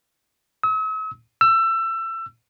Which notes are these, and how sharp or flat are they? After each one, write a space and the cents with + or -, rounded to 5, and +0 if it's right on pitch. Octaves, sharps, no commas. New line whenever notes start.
E6 -45
E6 +25